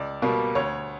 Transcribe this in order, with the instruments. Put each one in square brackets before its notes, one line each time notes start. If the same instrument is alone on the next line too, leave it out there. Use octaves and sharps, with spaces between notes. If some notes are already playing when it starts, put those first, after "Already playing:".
Already playing: [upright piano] C#2 D5
B2 G3 A#3
D2 C#5